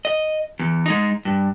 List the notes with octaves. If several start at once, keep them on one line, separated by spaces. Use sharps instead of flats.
D#5
E2
G#3 D#4
G2